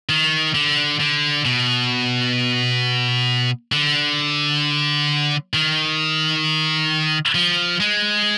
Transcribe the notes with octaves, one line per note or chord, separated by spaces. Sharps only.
D#3
D3
D3
B2
D3
D#3
F3
G#3